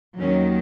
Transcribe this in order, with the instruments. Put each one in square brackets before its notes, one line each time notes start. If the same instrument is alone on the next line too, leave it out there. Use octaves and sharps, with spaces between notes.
[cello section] D#2 D#3 F#3 C#4